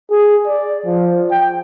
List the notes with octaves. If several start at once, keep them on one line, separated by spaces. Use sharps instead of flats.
G#4
D5
F3
G5